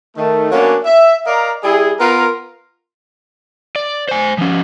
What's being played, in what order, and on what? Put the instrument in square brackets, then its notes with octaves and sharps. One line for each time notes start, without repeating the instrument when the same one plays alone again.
[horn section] D#3 A3
F#3 A#3 B3 C#4 D4
E5
A#4 D5 D#5 F5 A#5
G3 E4 G#4
B3 F4 A#4
[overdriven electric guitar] D5
C5 G#5
F3 C#4